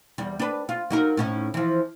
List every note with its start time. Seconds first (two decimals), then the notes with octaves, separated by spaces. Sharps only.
0.18 E2 G3
0.40 D4 B4
0.69 F4
0.90 F#3 D#4 A#4
1.17 A2 C#4 D#4
1.54 E3 F3